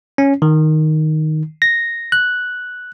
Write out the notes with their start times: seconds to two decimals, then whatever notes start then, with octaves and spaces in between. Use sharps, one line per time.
0.18 C#4
0.42 D#3
1.62 A#6
2.12 F#6